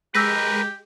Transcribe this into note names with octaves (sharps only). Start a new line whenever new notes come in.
G#3 G4 A#4 B4 E6 A#6 B6